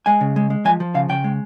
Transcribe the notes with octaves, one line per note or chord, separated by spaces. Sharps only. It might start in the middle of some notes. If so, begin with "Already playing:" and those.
G#3 G#5
C#3
G#3
G#3
F3 G#5
F3
C#3 F5
C#3 G5
G#3